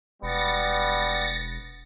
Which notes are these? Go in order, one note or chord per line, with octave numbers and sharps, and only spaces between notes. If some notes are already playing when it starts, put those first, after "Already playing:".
E1 G3 B3 A6 A#6 C#7